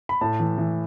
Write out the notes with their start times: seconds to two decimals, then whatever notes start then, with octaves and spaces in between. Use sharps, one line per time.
0.09 B5
0.21 A2 A5
0.40 E3
0.58 E3